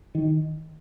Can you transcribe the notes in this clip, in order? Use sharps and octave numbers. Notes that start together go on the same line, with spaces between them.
D#3